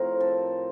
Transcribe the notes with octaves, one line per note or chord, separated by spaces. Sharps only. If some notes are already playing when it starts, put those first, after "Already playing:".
Already playing: A2 F3 C4 A#4
A4